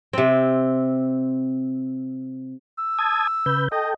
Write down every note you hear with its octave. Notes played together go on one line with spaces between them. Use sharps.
C3 C4
E6
A5 D#6 G#6
C#3 B4 G6
A4 D#5 G5